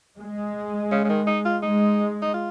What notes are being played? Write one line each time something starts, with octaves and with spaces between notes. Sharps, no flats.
G#3
C#3
C#3
D#3
D#4
F4
G#3 D#4
D#4
F4